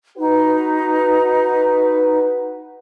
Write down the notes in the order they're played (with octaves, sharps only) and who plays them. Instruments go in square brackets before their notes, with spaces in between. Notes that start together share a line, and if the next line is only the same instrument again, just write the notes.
[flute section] D#4 [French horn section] F#4 B4